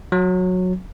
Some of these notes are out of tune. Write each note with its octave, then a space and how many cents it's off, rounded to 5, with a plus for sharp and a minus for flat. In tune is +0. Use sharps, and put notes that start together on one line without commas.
F#3 -15